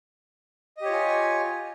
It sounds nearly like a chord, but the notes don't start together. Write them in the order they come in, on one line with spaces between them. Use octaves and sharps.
D#5 G4 C#5 F4 G#5